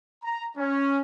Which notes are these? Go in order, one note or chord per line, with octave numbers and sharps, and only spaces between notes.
A#5
C#4